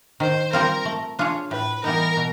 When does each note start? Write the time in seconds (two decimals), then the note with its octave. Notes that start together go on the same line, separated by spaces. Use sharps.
0.20 D#3 C5
0.53 G3 C4 F4 A#4
0.85 A3
1.19 D4 F4 G#4 C#5
1.51 A2 B4
1.84 E3 G3 B3 D#4 A#4
2.17 B2